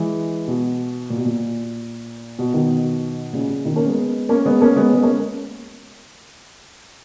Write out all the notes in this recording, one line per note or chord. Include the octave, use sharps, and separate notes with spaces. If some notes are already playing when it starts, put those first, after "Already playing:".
Already playing: E3 G#3
B2
A#2
B2
A#2
B2
B2 D#3
A#2 C#3
A#2 C#3
B2 D#3
A#3 C#4
G#3 B3
A#3 C#4
G#3 B3
A#3 C#4
G#3 B3
G#3 B3
A#3 C#4